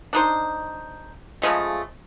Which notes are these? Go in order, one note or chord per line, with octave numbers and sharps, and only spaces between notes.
D4 D#4 C5
C#3 F3 G#3 A3